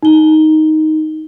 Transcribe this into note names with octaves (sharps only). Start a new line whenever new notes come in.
D#4 G7